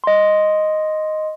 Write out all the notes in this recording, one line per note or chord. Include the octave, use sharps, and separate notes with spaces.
D#5 C6